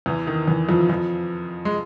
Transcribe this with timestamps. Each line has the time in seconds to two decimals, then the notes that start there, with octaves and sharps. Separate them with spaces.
0.06 E2 E3
0.27 D#3
0.47 E2 E3
0.69 F2 F3
0.89 F2 F3
1.65 G#3